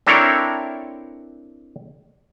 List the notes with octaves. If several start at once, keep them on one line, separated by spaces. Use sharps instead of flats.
C4 D4 E4 A4 A#4 C#5